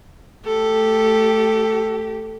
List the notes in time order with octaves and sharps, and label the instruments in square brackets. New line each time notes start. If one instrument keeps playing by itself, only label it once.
[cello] A3 G4 [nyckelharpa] A4